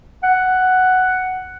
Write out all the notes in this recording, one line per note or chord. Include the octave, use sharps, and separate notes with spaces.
F#5